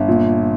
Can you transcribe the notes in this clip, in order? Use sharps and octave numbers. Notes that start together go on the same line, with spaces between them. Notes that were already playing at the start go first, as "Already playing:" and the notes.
Already playing: G1
A#2